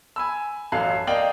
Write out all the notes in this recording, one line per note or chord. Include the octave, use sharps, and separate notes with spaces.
G#5 B5 E6
A1 F#2 A4 F5 F#6 C7
A#3 D5 D#5 F5 G5 F#7